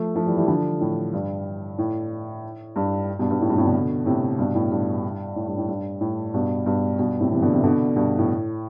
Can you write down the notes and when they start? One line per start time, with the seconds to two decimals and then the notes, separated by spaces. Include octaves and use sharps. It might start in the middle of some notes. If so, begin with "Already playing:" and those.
Already playing: F3 A3
0.16 F3 A3
0.27 E3 G3
0.37 E3 G3
0.48 D3 F3
0.81 A2
1.13 G2
1.78 A2
2.76 G2
3.19 G2 B2
3.30 G2 B2
3.41 A2
3.49 G2 B2
3.57 A2 C3
3.65 B2 D3
4.06 A2 C3
4.38 G2 B2
4.55 A2
4.71 G2
5.36 A2
5.47 G2
5.58 A2
5.68 G2
6.01 A2
6.33 G2 B2
6.66 G2 B2
6.99 G2 B2
7.20 A2 C3
7.31 C3 E3
7.42 B2 D3
7.53 C3 E3
7.63 B2 D3
7.96 G2 B2
8.18 A2